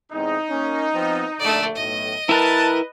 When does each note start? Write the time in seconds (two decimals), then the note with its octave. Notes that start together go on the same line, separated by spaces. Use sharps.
0.13 E2 C3 G#3 D#4
0.49 A#3 C#4
0.93 F3 B3 C4
1.39 A#1 D3 A3 D5
1.75 B1 A2 D#5
2.29 E4 A#4 B4 A5